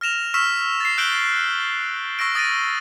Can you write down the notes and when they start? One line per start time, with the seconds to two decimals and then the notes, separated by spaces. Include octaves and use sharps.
0.01 F6 A#6 E7 F7
0.34 C#6 E6 F6 B6 E7
0.80 A6 C7
0.98 E6 F#6 G6 D7 F#7 G7
2.19 C#6 E6 A#6 D7
2.35 D#6 A6 A#6 D7 D#7